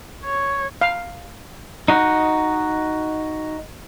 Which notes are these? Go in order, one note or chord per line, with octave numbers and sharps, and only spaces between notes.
C#5
F5
D#4 F#4